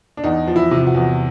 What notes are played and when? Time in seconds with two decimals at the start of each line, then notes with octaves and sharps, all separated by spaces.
0.17 D4
0.24 E2 D#4
0.48 F3
0.56 E4
0.71 C3
0.87 F#4
0.94 E2